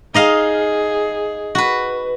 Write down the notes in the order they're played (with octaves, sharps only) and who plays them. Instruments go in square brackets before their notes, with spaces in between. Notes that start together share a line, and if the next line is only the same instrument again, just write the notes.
[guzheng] D#4 D#5 F5 [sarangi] G#4
[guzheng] F#4 B4